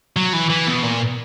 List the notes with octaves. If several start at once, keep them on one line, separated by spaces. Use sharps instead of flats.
F#3
E3
E3
B2
A#2